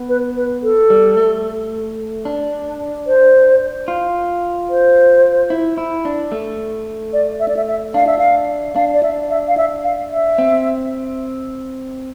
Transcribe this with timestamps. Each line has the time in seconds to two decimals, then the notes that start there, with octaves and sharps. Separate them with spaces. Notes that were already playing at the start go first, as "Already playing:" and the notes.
Already playing: B3
0.09 B4
0.36 B4
0.63 A4
0.90 G3
1.17 A3
2.25 D4
3.07 C5
3.88 F4
4.70 C5
5.50 E4
5.78 E4
6.05 D4
6.32 A3
7.13 D5
7.40 E5
7.48 D5
7.57 E5
7.68 E5
7.94 D4 F5
8.07 E5
8.18 F5
8.76 D4 F5
8.94 D5
9.03 E5
9.30 E5
9.48 F5
9.57 E5
9.84 F5
10.11 E5
10.38 C4